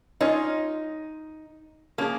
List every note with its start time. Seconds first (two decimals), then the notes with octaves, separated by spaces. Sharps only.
0.21 G#3 C#4 D#4 F4 C#5
1.98 F3 A#3 C#4 G#4